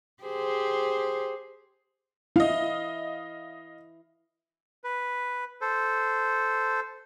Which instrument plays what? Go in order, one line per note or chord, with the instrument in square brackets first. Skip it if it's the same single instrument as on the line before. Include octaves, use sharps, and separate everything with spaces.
[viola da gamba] G4 G#4 C5
[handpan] E4 [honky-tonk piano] D#5 F5
[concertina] B4
A4 C5